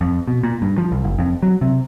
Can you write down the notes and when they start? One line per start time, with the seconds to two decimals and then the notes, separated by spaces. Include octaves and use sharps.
0.01 F2
0.28 B2
0.43 A#2
0.62 G2
0.78 F3
0.92 C2
1.04 F#1
1.18 F2
1.43 F#3
1.61 C3